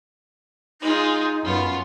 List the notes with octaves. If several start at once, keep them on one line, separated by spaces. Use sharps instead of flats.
G#3 D#4 F4
F#2 B3 F4